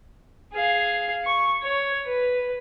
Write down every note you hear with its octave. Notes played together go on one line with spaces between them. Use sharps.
G#4 F5
C#6
C#5
B4